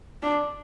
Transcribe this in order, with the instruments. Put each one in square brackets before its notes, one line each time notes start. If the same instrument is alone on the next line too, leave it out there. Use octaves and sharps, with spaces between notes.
[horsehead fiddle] D4